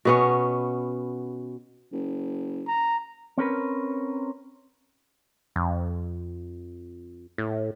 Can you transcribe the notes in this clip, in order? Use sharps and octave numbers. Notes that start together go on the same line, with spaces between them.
B2 B3 C#4
F#1
A#5
C4 C#4 A#4 B4
F2
A2